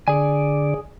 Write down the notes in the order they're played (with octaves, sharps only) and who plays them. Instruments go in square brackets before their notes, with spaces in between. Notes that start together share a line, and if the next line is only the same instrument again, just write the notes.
[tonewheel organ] D3 D5 [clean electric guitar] G#4 G#5